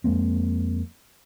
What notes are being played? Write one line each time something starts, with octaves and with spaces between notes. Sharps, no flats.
F2 G#3 A#3 C4